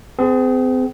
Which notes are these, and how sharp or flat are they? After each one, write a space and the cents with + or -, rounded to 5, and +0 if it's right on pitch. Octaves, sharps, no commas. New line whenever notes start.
C4 -35 G#4 +10